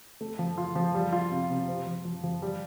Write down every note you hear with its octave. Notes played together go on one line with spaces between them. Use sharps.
A3
F3
F4
F3
G3
F4
C3
C3
C5
F3
F3
F3
G3